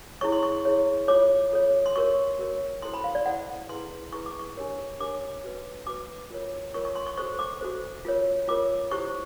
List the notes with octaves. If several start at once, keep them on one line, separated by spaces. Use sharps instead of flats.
E4 G#4 C#5 C#6
C6
C#6
E4 G#4 C#5
F4 A4 C#5 D6
F4 A4 C#5
C6
F#4 A#4 C#5 C#6
F#4 A#4 C#5
E4 A4 C5 C6
B5
F5
D5
E4 A4 C5 F#5
E4 G#4 B4 C6
E4 G#4 B4 C#6
D6
C#6
D4 G4 A#4 C#5
D4 G4 A#4 C#5 D6
F#4 B4
F#4 B4 D6
F4 A#4 C#5
F4 A#4 C#5 C#6
C#6
C6
C#6
F#4 A4 C5 C#6
D6
F#4 A4 C5
F4 A#4 C#5
F4 A#4 C#5 D6
E4 G4 C5 C#6